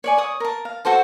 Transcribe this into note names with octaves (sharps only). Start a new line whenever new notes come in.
C#5 D5 G#5
C#5 D#6
A#4 A5
F5
F#4 A4 C5 A5